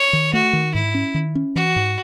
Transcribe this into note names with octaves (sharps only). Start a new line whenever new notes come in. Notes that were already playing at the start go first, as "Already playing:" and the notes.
Already playing: C#5
D#3
A3 F#4
D#3
G#2 E4
C#4
D#3
C#4
E3 F#4
G#2